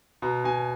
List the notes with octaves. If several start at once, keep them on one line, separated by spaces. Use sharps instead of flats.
B2 A#5
B2 G#5